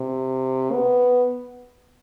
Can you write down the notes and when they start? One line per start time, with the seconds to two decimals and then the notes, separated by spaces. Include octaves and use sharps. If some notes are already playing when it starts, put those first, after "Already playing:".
Already playing: C3
0.73 B3